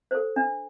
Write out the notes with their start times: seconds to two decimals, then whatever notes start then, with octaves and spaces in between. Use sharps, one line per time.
0.11 A4 C5
0.36 D4